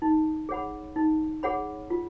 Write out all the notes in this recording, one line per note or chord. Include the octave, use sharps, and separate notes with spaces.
D#4
G#4 C#5 F#5 B5
D#4
G#4 C#5 F#5 B5
F4